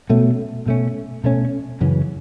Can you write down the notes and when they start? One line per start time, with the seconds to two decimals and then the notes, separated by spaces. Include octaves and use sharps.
0.10 B2 A3 C#4
0.66 B2 A3 C#4
1.24 B2 A3 C#4
1.81 F#2 C#3 E3 C#4